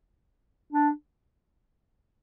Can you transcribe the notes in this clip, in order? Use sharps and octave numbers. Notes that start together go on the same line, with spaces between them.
D4